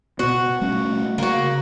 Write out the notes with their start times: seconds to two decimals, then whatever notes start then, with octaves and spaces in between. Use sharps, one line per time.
0.19 B2 B3 F#4
0.61 G3 A3 C#4
1.18 C#3 A#3 F#4